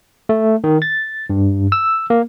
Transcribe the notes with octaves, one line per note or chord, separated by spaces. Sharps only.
A3
D#3
A6
G2
E6
A#3